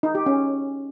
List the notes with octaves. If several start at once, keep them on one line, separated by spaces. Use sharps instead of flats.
D#4
G4
C#4